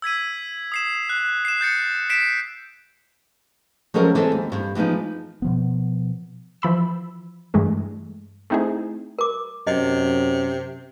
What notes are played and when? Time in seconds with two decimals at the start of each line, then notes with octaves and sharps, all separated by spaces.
0.02 E6 G#6 B6 D#7
0.72 D#6 C7 E7
1.09 F#6
1.45 C7 E7
1.61 G6 A6 C#7
2.10 B6 C7 D7 E7
3.94 F3 F#3 G#3 C#4 A4 A#4
4.15 E3 G#3 C4 A4
4.32 D#2
4.52 G2
4.75 E3 F3 G#3 B3 D#4
5.42 B2 F3 B3
6.62 E3 F3 B5 E6
7.54 G2 E3 G#3 A3
8.50 A3 C4 D#4 E4 G#4
9.19 A#4 D6
9.67 F#2 C3 D#5